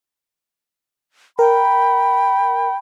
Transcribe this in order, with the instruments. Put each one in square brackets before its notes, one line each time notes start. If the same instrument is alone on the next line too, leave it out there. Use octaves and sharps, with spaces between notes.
[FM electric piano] A#4 [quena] G5 [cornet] B5